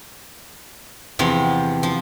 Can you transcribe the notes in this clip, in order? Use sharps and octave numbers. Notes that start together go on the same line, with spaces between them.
E2 C3 F3
F3